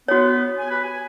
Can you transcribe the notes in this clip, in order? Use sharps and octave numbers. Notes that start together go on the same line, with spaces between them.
B3 F#4 C#5
G#5
G4 B4
G#5